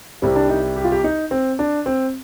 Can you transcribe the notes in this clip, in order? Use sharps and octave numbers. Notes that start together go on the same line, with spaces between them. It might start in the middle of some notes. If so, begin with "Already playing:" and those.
C2 C3 G3 C4
D4
D#4
G4
F4
G4
D#4
C4
D4
C4